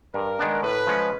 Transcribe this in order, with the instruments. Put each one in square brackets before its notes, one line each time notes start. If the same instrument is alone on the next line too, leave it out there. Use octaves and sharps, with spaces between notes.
[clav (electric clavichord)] G2 [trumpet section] A#4
[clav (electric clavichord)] D#3 G#3 B3 D4
[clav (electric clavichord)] A2 [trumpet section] B4
[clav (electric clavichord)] F3 G#3 C#4